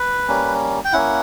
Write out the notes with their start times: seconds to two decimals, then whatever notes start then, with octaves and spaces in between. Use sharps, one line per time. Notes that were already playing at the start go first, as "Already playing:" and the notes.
Already playing: B4
0.28 G3 A#3 C#4
0.85 G5
0.93 A#3 C#4 E4 F#5